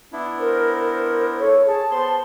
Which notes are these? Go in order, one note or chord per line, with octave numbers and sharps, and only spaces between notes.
B3 D4 E4
A#4 C5
A#4
A4 C#5
G#4 A5
B3 C5 C6